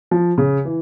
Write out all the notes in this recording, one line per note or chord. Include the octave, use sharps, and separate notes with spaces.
F3
C#3
E3